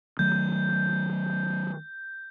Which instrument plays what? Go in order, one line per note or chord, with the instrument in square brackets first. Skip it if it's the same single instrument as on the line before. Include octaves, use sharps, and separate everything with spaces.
[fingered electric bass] D#3 F#3 A3 [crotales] G6